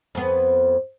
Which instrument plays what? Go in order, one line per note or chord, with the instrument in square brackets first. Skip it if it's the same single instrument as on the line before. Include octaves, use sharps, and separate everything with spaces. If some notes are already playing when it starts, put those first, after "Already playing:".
[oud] F2 B3